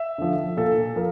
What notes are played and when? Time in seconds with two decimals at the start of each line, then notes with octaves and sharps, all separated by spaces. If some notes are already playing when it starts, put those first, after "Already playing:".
Already playing: E5
0.18 D3 F3
0.57 A#2 A4
0.96 F3 A#4